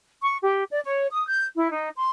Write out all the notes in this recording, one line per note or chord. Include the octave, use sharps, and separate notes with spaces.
C#6
G4
D5
C#5
D#6
G6
E4
D#4
C6